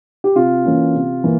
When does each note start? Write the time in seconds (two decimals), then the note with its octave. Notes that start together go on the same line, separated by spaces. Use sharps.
0.24 G4
0.35 C3 F4
0.65 E3 A#3 C#4
0.94 C3
1.24 E3 A#3